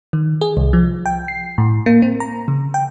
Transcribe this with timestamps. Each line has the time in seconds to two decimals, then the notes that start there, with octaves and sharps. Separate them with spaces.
0.13 D#3
0.41 G#4
0.57 C2
0.73 F3
1.06 G5
1.28 C7
1.58 A2
1.86 A#3
2.02 C4
2.20 A#5
2.48 C#3
2.74 G5